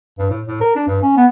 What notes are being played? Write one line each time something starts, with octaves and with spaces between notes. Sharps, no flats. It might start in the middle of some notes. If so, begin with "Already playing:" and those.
G2
A2
A2
A#4
D4
G2
C#4
B3